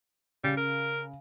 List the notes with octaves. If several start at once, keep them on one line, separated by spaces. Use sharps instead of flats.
C#3 G3
A#4